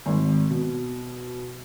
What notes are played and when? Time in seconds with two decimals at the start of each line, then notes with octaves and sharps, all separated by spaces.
0.06 G#1
0.51 B2